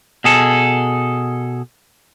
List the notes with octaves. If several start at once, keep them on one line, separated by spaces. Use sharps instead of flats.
B2 G#4 A4